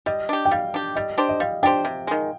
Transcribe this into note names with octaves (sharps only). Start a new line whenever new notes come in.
G3 D#5
D4 G4
G5
G3 F5
D4 G4
G3 D#5
D4 G4 C5
D#5
G3 F5
D4 G4 C5 G5
C3
D#3 G#3